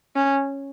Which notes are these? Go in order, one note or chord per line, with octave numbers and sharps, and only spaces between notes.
C#4